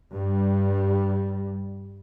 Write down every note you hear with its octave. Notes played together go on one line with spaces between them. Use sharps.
G2 G3